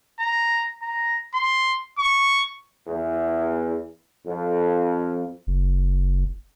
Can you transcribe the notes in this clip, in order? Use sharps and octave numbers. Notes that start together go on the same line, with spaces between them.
A#5
A#5
C6
C#6
E2
F2
F#1